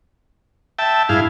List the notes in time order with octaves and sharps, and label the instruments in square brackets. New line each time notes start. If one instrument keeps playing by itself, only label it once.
[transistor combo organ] E5 G5 A5
[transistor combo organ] G2 G#4 F5 [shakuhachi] E4